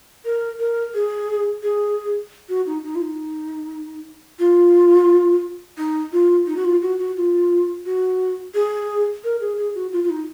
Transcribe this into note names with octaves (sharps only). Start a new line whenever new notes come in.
A#4
A#4
G#4
G#4
F#4
D#4
D#4
F4
D#4
F4
D#4
F4
D#4
F#4
F4
F#4
F#4
F4
F#4
G#4
A#4
G#4
G#4
F#4
F4
F4
D#4